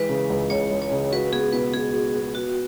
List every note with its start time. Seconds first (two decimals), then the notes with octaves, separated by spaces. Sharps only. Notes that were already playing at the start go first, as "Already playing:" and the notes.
Already playing: E3 G#3 B4
0.09 C#3
0.30 C#2
0.50 C#2 C#5
0.71 G#3
0.82 C#5
0.91 C#3
1.12 F#4 B4
1.32 B3 G#4
1.53 B2 B4
1.74 B2 G#4
1.94 F#4
2.15 B3
2.35 B3 F#4